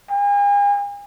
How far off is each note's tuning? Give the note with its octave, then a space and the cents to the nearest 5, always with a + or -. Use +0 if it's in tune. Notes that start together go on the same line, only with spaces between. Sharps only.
G#5 -40